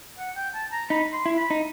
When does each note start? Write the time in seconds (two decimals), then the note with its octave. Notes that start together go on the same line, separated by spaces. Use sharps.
0.18 F#5
0.36 G5
0.54 A5
0.72 A#5
0.90 D#4 B5
1.13 C6
1.26 E4
1.37 B5
1.50 D#4